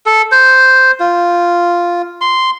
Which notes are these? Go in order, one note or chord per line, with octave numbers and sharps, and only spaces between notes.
A4
C5
F4
C6